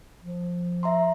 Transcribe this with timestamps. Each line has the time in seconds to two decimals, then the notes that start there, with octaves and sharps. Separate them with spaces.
0.24 F3
0.83 E5 A#5 C6